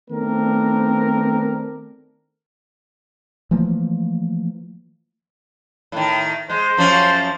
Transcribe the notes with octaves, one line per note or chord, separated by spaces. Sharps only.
D#3 A3 B3 C4 D4 A#4
E3 F3 A3 A#3
A2 D#3
G#3 C5
F#2 F3 C#4